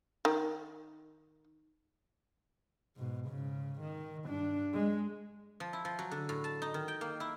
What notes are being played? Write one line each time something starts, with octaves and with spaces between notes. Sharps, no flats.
D#3
G#2 B2
G#2 C#3
D#3
G2 D4
G#3
F3
E4
F3
F#3
D3
A2
A5
D#4
D#3
G5
A#3
E4